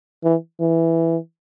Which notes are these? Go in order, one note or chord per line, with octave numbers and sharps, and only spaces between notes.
E3
E3